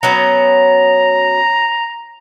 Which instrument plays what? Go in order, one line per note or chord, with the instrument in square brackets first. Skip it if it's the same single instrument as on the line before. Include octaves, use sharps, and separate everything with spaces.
[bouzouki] F#3 B3 C#4 [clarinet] A#5